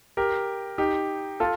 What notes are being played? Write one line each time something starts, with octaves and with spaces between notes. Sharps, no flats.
G4 A#4
D#4 G4
F4 A4